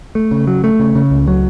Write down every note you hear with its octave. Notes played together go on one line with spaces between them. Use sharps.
A3
C#3
F#3
A3
C#3
C#3
C#2
F#3